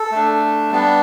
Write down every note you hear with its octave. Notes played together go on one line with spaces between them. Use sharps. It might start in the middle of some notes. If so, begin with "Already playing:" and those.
Already playing: A4
A3 D4
G3 B3 D4